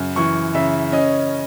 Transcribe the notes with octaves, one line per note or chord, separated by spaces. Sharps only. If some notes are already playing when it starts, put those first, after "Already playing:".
Already playing: F#2 C#3
E3 C#6
C#3 E5
C#4 D#5